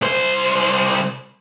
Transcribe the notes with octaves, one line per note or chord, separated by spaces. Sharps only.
C2 C5